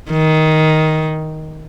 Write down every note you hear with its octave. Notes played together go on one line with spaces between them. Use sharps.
D#3